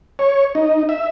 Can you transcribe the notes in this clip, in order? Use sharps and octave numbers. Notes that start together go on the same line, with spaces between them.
C#5
D#4
E5